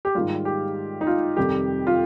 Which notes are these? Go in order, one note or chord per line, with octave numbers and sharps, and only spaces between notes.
G4
G#2 D#3 G3 F4
G4
D#4
F4
F2 C3 D#3 G3 G4
F4